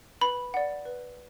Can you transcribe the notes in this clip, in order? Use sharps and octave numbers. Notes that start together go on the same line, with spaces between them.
B4 B5
D5 F#5
B4